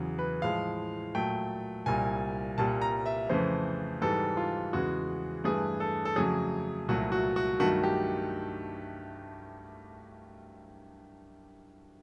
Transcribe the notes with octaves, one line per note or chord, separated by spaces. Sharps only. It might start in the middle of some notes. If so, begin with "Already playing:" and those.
Already playing: E2 C#3 F#3
B4
A2 F3 G#3 F5
A#2 F#3 A3 G5
C2 A#2 G3 G#5
C2 A#2 G3 A5
A#5
E5
F2 C#3 E3 A3 C5
G#2 E3 G3 A4
F4
E2 C#3 E3 G#3 F#4
G2 E3 A3 G#4
A4
A4
F2 C#3 F#3 A3 G#4
C2 A#2 F#3 A3 F#4
F#4
F#4
G2 D#3 F#3 A3 F#4
G4